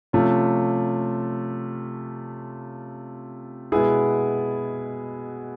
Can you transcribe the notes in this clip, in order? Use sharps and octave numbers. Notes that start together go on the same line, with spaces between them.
C3 F3 A3 C#4 F4
B2 G#3 B3 E4 G#4